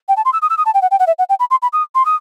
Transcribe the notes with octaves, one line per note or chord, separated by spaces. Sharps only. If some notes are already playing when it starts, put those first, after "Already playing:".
G5
A5
C6
E6
D#6
E6
D#6
A5
G5
F#5
G5
F#5
E5
F#5
G5
B5
C6
B5
D#6
C6
D#6